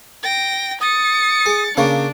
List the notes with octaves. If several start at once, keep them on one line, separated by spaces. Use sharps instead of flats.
G5 A#6
D#6 A6 C#7
G#4
C#3 A#3 D4 C#5